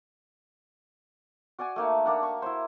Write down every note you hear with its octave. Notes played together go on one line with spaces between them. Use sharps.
F#4 D5 F#5 G#5
A3 A#3 D#4
A#3 D4 F#5
C#6
E4 C5